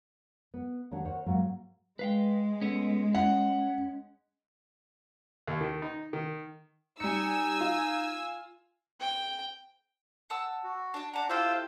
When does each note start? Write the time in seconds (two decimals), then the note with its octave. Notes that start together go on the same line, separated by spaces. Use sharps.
0.54 B3
0.91 D#2 D4 C#5 F#5
1.05 A#4 C5 C#5 F#5
1.26 G#2 F#3 A#3 C4
1.99 G#3 B4 F5 G5
2.62 A3 B3 C#4
3.15 C#4 F#5
5.47 D#2
5.61 D#3
5.82 D#4
6.13 D#3
7.00 G3 D#4 G#5 E6 C#7
7.61 F4
9.00 G5
10.30 F#5 A5 E6
10.64 F#4
10.94 D4 A5
11.13 D4 D5 F#5 A5 A#5
11.29 E4 F4 G4 A4 C5 E6